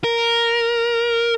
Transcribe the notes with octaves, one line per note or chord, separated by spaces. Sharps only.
A#4